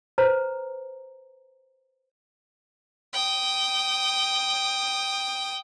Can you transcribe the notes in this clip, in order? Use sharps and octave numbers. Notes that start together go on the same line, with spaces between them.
B4 C5 A#5
G5 D#6